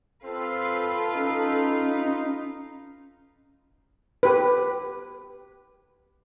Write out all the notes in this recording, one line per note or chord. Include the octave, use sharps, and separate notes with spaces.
C4 F4 A4 B4 F5
C#4 D#4
G4 B4